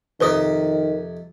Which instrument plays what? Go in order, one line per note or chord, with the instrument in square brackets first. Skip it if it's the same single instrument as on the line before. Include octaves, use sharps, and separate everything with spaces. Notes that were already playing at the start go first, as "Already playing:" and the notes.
[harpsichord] F2 C3 D#4 [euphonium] D#3 [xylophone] B4 C5 D#6